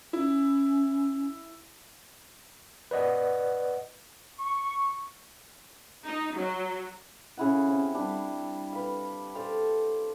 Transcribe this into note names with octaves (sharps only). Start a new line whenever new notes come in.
C#4 E4
B4 D5 D#5 F#5
C#6
D#4
F#3
C#3 E4 F#5
C3
G3 D4
B4 F5
A4 C5 D5 F5